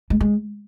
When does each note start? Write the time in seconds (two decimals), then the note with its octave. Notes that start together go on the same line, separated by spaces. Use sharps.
0.10 G#3
0.21 G#3